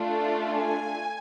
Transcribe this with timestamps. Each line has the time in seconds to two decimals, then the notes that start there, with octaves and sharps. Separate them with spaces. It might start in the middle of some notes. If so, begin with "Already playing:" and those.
Already playing: A3 D4 F4
0.49 G#5